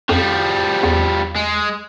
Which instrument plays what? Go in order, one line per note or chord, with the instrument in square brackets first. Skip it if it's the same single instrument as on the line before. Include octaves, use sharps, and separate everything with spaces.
[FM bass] F2 [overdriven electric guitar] F3 G3
[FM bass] E2
[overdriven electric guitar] G#3